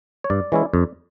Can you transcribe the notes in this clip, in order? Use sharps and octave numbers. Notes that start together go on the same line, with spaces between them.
C#5
G2 D5
E3 G#3 C#4 E4
F2